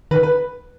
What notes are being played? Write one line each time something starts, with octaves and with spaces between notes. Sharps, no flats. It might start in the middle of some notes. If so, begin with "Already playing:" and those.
D#3 B4
B4